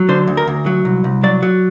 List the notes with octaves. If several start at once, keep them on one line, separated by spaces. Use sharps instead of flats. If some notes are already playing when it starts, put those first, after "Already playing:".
Already playing: F#3
D3 C5
D2
A#4
D2
F#3
C2
C2
F#3 D5
F#3